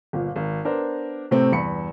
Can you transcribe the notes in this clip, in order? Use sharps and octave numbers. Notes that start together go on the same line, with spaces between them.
G1 A#2
G#1
B3 D4 A#4 C5
A2 C3 A3 C4
E2 G2 B5 C#7